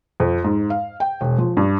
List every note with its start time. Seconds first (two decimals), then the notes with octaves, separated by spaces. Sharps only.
0.20 F2
0.44 G#2
0.70 F5
1.00 G5
1.21 E1
1.38 F3
1.57 G2